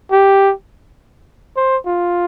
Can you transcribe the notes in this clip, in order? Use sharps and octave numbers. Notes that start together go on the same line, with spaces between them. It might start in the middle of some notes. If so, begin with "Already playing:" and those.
G4
C5
F4